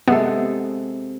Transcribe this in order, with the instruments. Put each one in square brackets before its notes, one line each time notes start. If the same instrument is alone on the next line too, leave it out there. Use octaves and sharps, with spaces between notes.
[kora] C3 G#3 A4 [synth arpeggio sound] B3